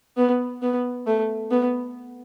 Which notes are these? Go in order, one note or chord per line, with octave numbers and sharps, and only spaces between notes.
B3
B3
A3
B3